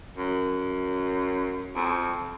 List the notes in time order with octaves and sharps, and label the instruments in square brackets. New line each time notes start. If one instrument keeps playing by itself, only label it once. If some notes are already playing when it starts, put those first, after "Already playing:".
[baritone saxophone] F#2
F2